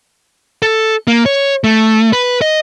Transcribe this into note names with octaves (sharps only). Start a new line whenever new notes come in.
A4
A#3
C#5
A3
B4
D#5